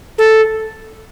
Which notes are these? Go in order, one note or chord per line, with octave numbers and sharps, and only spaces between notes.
A4